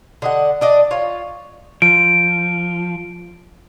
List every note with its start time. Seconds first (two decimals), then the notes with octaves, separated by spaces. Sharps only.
0.22 D3 D#5 F#5
0.61 D4 D5 D#5
0.91 F4 C#5
1.82 F3 D7